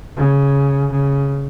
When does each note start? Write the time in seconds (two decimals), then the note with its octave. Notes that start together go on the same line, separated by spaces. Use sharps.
0.17 C#3
0.91 C#3